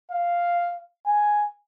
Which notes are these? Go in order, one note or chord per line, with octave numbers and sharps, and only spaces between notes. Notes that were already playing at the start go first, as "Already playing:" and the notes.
F5
G#5